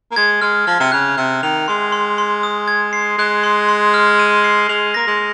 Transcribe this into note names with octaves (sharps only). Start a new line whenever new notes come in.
A#3
G#3 G#6
G#3 F6
F3 F6
C3
C#3 F#6
C3 F#6
D#3 F7
G#3 C6
C6
C6
D#6
G#6
C7
G#3 F#6
C6
C6
F6
D#7
C7
G#3 F7
A#3 A#6
G#3